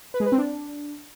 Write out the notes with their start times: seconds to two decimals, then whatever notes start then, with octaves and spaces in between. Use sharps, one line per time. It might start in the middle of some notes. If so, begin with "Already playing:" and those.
0.14 B4
0.20 G#3
0.26 B4
0.32 C4
0.38 D4